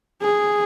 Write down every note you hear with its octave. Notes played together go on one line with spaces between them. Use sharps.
G#4